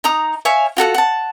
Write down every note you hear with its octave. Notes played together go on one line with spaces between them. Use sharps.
D#4 A#5 D#6
C#5 E5 F5 G#5
F4 F#4 A4 F#5
F#5 A5